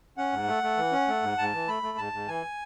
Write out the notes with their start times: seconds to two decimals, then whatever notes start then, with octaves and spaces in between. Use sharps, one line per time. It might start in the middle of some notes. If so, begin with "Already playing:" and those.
0.18 C#4 F#5
0.32 G#2
0.48 A3
0.63 A3
0.77 E3
0.92 C#4
1.08 A3
1.22 G#2
1.38 G#2 A5
1.53 E3
1.68 A3 B5
1.83 A3
1.98 G#2 A5
2.13 G#2
2.28 E3 G#5